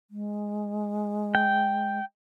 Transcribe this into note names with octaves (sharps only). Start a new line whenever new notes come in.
G#3
G5